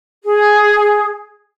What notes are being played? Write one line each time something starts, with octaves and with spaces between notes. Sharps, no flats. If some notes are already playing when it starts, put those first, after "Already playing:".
G#4